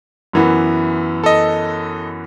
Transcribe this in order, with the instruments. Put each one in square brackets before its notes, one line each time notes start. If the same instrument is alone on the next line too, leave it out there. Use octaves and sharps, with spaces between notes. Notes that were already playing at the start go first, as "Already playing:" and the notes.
[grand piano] F#2 E3 B3
[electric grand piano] A4 D#5